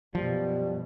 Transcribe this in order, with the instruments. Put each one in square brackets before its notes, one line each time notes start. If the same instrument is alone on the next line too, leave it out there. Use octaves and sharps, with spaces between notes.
[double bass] F#2 B2 [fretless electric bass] F3 [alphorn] G3